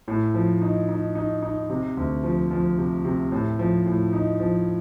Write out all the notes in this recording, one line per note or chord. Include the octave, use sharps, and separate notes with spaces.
A2
F3
D#4
D#4
D#4
D#4
C3
D2
F3
F3
C3
C3
A2
F3
A2
D#4
F3